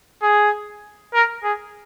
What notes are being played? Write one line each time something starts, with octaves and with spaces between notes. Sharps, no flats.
G#4
A#4
G#4